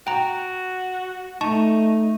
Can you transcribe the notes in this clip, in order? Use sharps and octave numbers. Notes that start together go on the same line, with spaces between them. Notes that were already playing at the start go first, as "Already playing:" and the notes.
F#4 G5 A#5
A3 D#4 A5 C#6